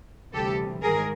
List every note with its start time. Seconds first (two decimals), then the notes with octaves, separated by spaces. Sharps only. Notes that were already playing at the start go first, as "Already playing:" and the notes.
0.32 D2 C3 E3 G3 G4 A4
0.82 G#2 D#3 G#4 A#4